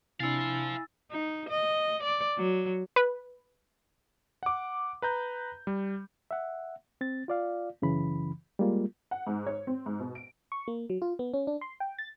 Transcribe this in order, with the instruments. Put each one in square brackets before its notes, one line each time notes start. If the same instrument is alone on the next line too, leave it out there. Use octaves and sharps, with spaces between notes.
[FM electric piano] C3 D4 [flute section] E4 G#5 [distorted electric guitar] C5 F5 [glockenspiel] E6 A6
[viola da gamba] D#4
D#5
D5
F#3
[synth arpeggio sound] B4
[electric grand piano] F#5 D6
B4 A#5 G6
G3
[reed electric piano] E5 F#5
C4 A6
F4 D5 F5
F#2 C#3 E3 B5
G3 G#3 A#3 F4
[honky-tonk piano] F#5
G#2
C#5
C4
G#2
B2
D7
[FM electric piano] C#6
A#3
F#3
F4
B3
C#4
D4
C6
G5
A6